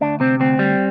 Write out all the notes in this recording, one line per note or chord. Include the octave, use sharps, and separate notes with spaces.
D2 D4
C3 C4
D2 C4
G3